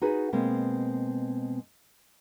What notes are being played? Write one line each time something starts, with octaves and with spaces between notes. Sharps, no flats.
D#4 F#4 G#4 B4
B2 G#3 A#3 C4